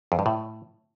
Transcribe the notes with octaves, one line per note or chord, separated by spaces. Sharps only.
F2
G2
A2